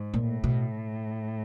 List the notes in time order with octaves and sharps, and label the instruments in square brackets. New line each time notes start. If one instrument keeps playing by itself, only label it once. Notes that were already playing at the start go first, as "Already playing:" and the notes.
Already playing: [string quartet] G#2
[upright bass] A#2
[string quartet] A2
[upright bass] B2